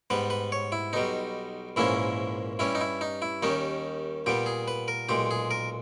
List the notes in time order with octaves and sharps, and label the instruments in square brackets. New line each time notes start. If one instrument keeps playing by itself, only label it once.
[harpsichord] G#2 G3 B3 B4
B4
C#5
E4
B1 B2 G3 D#4
A#1 G#2 E3 A#3 C#4 E4
G2 G3 C#4 E4
D#4
E4
D#4
E4
D#2 D#3 G3 C#4 D#4
A#2 G3 B3 G4
G#4
B4
A#4
B1 A#2 G#3 G4
G#4
A#4